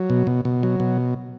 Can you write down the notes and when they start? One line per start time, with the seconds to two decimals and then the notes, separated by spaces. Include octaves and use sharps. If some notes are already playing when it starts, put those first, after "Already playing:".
Already playing: F#3
0.10 B2
0.27 B2
0.45 B2
0.63 F#3
0.80 B2